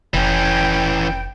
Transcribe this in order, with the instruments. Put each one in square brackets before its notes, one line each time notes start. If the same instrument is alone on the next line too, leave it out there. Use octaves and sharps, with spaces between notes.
[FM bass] F1 [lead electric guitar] E3 C#4 [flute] G5